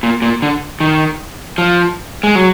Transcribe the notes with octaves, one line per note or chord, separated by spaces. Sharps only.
A#2
A#2
D3
D#3
F3
G#3
F#3